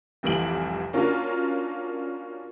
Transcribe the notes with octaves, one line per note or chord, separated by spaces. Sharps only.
F1 C2 F2 E3 D7 F#7
A#3 C#4 D4 F4 F#4 A#4